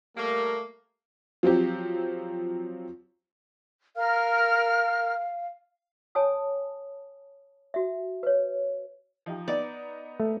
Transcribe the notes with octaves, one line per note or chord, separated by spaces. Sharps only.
G3 A3 A#3
F3 F#3 C4 G4
A#4 F5 F6
C#5 G#5 A5 D#6
F#4 E5
B4 C#5
F3 D#4 G4
B3 D#4 D5
A3